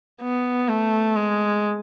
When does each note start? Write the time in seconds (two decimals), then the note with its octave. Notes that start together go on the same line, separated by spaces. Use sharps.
0.22 B3
0.69 A3
1.16 G#3